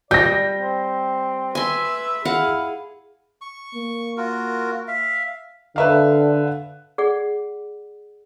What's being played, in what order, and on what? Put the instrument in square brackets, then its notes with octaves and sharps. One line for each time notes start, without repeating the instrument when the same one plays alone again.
[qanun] G3 [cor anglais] D5 [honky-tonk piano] G6 A#6
[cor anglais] C4
[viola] B4 E5 [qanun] G#5 C6
[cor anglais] E4 [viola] G#4 [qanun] F5 F#5
[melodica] C#6
[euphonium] A#3
[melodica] F4 F#4 A#4
E5 F5
[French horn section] D3 [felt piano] B4 E5 F5
[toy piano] G#4 D5 F#5